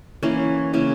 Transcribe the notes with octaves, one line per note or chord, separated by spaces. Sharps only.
E3 A#3 C#4
C#3 E3 A#3 C#4